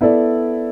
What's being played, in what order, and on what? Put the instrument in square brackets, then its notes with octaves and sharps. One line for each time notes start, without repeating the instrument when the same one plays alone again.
[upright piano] B3 E4 A4 D5